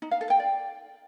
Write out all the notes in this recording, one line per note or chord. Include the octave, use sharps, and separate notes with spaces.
D#4
F5
A4
G5
D5